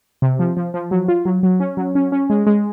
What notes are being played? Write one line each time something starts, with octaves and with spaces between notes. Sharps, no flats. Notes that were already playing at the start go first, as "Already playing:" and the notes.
C3
F3
F3
F3
F#3
F4
F#3
F#3
C#4
F#3
C#4
C#4
G#3
G#3